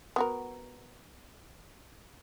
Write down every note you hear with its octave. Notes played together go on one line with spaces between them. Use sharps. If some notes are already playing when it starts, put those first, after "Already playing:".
B3 F#4 A#4